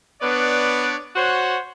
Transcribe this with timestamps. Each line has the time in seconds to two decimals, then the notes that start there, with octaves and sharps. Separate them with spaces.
0.22 B3 D4 B4 C#5 D5
1.16 F#4 C5 C#5 F#5